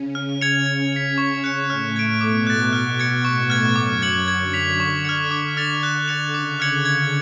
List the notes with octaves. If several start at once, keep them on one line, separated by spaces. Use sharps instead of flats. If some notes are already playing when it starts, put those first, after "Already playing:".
Already playing: C#3 C#4
C#3 C#4 F6
G#6 C#7 F7
G#6
B6 F7
C#6
F#6 C#7
A2 A3 F6
G#6 D7
B2 B3 D6
F#6 A6
B2 B3 F6
G#6 C#7
A2 A3 C#6
F6 G#6
F#2 F#3 D6
G#6 C#7 F#7
D3 G#6
B6 F7
C#6
F6 G#6 C#7
D6
F6 A6 C#7 F7
F#6
A6 C#7 F7
C#3 D6
F6 G#6 C#7 F#7
G#6